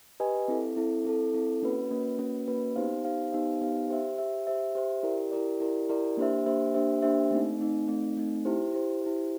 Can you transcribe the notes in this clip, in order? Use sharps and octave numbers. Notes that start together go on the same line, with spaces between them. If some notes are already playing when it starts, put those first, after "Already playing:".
G4 B4 D#5 G#5
C4 E4 A4
C4 E4 A4
C4 E4 A4
C4 E4 A4
A#3 C#4 F#4 B4
A#3 C#4 F#4 B4
A#3 C#4 F#4 B4
A#3 C#4 F#4 B4
B3 D#4 G4 C5 F5
B3 D#4 G4 C5 F5
B3 D#4 G4 C5 F5
B3 D#4 G4 C5 F5
G4 C5 E5
G4 C5 E5
G4 C5 E5
G4 C5 E5
E4 G4 A#4 D5
E4 G4 A#4 D5
E4 G4 A#4 D5
E4 G4 A#4 D5
A#3 D4 G4 C5 E5
A#3 D4 G4 C5 E5
A#3 D4 G4 C5 E5
A#3 D4 G4 C5 E5
A3 C4 D#4
A3 C4 D#4
A3 C4 D#4
A3 C4 D#4
E4 G4 C5
E4 G4 C5
E4 G4 C5